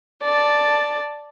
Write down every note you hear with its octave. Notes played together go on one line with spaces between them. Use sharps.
D5 A5